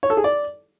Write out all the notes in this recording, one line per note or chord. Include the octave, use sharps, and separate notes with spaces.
C#5
A4
G#4
D5